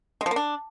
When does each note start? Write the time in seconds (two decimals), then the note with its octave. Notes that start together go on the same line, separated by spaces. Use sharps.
0.21 G#3
0.26 F3
0.31 A#3
0.36 D4